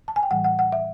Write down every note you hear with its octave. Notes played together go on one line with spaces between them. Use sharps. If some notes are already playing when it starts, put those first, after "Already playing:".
A5
G#5
G5
A2 E3 G3 F#5
F#5
F#5
E5